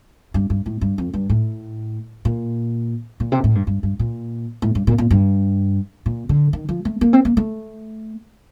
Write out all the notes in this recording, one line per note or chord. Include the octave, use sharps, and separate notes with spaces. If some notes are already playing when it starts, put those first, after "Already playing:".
G2
G2
A2
G2
F2
G2
A2
A#2
A#2
C3
A2
G2
G2
G2
A#2
A2
G2
A#2
A#2
G2
A#2
D3
D#3
F3
A3
A#3
C4
A#3
A3